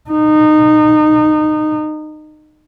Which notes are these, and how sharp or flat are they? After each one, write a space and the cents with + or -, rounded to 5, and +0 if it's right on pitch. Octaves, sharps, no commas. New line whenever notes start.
D#4 -25